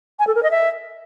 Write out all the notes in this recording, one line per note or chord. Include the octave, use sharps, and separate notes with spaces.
G#5
A4
A#4
D#5
E5